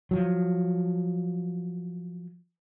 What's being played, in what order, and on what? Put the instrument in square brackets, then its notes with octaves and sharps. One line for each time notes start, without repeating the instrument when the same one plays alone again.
[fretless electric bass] F3 F#3